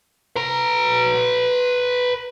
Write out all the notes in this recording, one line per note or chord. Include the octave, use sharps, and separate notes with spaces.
B4 A#5